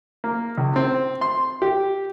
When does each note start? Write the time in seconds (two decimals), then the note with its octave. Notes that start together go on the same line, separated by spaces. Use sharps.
0.24 A#3
0.58 C#2
0.76 C4
1.21 C6
1.62 G4